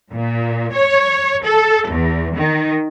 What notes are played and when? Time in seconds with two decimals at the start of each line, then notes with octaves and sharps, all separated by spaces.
0.11 A#2
0.72 C#5
1.44 A4
1.89 E2
2.35 D#3